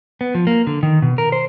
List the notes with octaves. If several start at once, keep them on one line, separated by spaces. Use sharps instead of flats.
B3
F3
A#3
D3
D#3
B2
A#4
C5